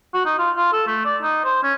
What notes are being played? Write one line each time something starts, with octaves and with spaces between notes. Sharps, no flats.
F#4
D#4
F4
F4
A4
A3
D5
D#4
C5
C#4